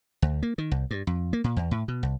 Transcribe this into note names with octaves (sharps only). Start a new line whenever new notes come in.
D2
A#3
D#3
C2
G2
F2
A#3
A#2
E2
A2
B2
C2